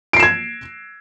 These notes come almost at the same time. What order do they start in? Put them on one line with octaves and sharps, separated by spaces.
D7 C7 E7 G#6